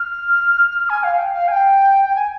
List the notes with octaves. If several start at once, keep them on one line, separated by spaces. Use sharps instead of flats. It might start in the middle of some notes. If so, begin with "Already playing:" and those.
Already playing: F6
G#5
F5
G5
F5
G#5
G5
G5
G#5